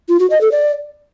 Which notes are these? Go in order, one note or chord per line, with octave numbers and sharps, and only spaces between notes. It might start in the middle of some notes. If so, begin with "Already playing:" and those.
F4
F#4
D#5
A4
D5